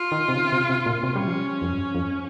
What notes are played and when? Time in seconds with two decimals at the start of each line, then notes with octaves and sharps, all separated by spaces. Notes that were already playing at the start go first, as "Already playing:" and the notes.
Already playing: F4
0.12 D#3
0.28 C3
0.35 C#3
0.52 C3
0.69 C3
0.86 A#2
1.03 C3 C#4
1.16 G3
1.27 F3
1.62 F2
1.73 G2
1.95 F2